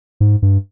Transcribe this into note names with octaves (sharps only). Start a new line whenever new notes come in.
G#2
G2